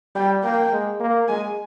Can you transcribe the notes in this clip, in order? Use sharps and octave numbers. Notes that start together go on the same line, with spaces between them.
G3 G5
A#3 G5
G#3
A#3
G#3 G#5